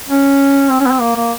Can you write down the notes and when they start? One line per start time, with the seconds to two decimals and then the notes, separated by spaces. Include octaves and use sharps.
0.08 C#4
0.70 C4
0.80 C#4
0.86 B3
0.91 C4
1.00 A#3
1.16 A#3